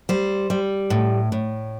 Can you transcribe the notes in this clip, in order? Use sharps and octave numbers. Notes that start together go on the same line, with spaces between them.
G3 C5
G3
A2
A2